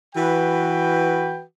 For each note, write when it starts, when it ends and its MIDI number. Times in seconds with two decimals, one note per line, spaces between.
0.14 1.42 52
0.14 1.42 66
0.14 1.42 71
0.14 1.42 79